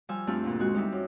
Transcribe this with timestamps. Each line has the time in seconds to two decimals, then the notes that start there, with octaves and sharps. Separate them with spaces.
0.09 F3 G3 G#5 E6
0.27 G2 A3 C4 D4 F4 G4
0.44 D2 A#2
0.59 G#3 C4 F#4
0.75 G3 D#4 G4 E5
0.92 F#2